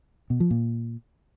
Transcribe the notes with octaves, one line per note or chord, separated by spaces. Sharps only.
B2
F3
A#2